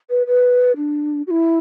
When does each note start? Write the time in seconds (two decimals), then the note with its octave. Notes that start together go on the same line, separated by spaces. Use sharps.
0.10 B4
0.27 B4
0.77 D4
1.27 F#4
1.31 E4